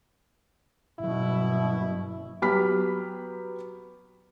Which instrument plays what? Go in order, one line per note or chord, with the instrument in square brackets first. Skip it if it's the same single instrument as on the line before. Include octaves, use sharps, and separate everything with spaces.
[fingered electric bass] G1 F#3 [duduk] B2 [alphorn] E4
[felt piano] F#3 B3 G4 B5 F6 B6